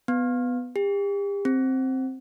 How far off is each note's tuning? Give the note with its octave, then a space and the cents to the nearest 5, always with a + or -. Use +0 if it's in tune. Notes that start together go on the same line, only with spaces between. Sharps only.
B3 +10
G4 +40
C4 +5